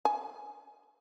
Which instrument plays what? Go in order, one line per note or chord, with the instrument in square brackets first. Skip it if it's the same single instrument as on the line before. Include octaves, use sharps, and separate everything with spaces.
[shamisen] G#5